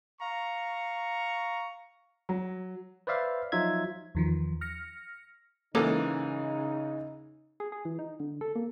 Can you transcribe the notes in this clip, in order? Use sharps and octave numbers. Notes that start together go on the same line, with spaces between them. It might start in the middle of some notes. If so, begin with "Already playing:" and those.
F5 A#5 C#6
F#3
B4 C5 D5 E5 F5
F3 F#3 D#4 F4 E5 G#6
E2 D#3 F3
F6 A#6 C#7
G#2 C#3 E3 A#3 C#4 D#4 A4
G#4
G#4
E3
D#4
D3
A4
A#3